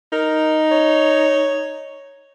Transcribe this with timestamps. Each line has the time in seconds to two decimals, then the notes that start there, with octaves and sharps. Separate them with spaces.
0.12 D#4 A#4
0.71 C#5